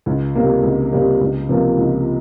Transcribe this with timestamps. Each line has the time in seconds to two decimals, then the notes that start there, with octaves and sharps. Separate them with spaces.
0.06 C#2
0.35 C3 G3 A#3
0.63 C#2
0.92 C3 G3 A#3
1.21 C#2
1.49 C3 F3 A#3
1.78 C#2